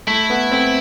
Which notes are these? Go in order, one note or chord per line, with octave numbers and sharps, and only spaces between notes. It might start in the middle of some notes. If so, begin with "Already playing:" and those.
A3 E4
B3
C4